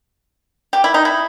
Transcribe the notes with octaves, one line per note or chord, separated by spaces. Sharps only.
G4
E4
D#4
E4